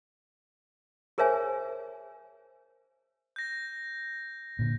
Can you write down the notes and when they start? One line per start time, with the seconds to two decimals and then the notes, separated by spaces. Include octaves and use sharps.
1.18 G#4 A#4 C5 C#5 E5 G#5
3.36 G6 A#6
4.59 A#2 D3